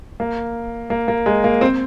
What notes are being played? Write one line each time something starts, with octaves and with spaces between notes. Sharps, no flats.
A#3
A#3
A#3
G#3
A#3
C4